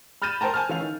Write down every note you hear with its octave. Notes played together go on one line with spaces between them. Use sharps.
B5 F6 G6 A6 D#7 E7
A#4 C5 G5 A5 A#5
G#5 A5 F6
E3 C#4 F5 F7
D#3